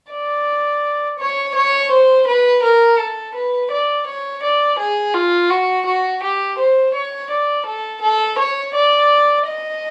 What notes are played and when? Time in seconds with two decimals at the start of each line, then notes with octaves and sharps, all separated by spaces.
0.11 D5
1.19 C#5
1.55 C#5
1.91 C5
2.28 B4
2.63 A#4
2.99 A4
3.35 B4
3.72 D5
4.07 C#5
4.43 D5
4.79 G#4
5.15 F4
5.50 F#4
5.86 F#4
6.23 G4
6.59 C5
6.95 C#5
7.31 D5
7.66 A4
8.02 A4
8.39 C#5
8.74 D5
9.46 D#5